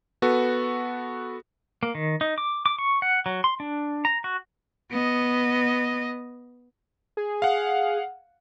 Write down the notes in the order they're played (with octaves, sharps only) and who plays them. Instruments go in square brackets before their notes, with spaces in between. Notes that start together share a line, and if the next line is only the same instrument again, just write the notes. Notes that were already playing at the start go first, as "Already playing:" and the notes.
[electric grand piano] B3 F#4 A4 B4
[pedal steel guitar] A#3
D#3
D#4
D6
D6
C#6
F#5
F#3
C6
D4
A#5
F#4
[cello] B3 D#5
[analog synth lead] G#4
[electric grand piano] F5 F#5